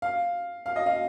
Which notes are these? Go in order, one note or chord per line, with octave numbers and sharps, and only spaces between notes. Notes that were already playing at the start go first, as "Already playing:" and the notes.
F5
F5
D#5
F5